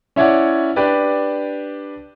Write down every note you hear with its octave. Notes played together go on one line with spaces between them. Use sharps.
C#4 E4 C#5 D5 F#5
D4 G4 B4 D5